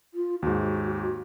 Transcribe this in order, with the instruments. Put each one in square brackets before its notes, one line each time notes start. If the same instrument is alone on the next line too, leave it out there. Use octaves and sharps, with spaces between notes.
[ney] F4
[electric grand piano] D#2 G#2 [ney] F#4